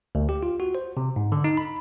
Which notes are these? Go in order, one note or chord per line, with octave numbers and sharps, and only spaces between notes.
D2
G4
F4
F#4
C5
C3
G#2
D3
D#4
B5